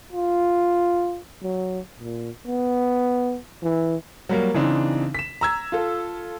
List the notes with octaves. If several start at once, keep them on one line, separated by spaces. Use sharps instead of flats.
F4
F#3
A#2
B3
E3
F#3 G3 A#3
C#3 E3 C4 D4 D#4
B6 E7
A#5 E6 G#6
F4 A4